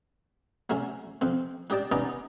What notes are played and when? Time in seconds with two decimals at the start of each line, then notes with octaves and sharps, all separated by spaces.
0.70 F#3 A3 C#4
1.21 F2 C4
1.70 D4 G4 D#5 G5 A5
1.92 B3 C#4 D#4 D5 D#5